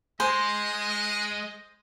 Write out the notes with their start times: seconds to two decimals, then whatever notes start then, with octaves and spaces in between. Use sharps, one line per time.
0.20 G#3 C5 D#5 G#5